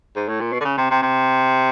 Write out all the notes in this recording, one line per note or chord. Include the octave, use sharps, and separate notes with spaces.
G#2
A2
A#2
B2
D3
C#3
C3
C3
C3